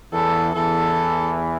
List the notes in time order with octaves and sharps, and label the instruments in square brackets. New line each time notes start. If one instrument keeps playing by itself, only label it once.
[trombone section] E2 E3 [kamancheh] A4
[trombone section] E2 E3 [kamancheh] A4